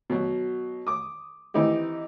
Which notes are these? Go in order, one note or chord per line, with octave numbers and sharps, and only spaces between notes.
B2 F#3
D6 D#6
E3 C4 D#4 E4 G4